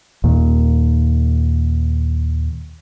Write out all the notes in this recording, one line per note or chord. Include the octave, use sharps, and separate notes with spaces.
D#2 A#2